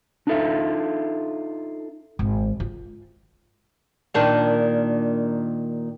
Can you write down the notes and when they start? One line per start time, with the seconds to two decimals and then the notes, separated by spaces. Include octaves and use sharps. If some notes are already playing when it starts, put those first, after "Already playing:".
0.27 D4 D#4 F4 A4 E5
2.19 G#1
2.60 F4
4.14 A#2 D#3 D4